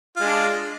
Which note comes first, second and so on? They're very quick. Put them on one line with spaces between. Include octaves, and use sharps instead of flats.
F4 G#3 D4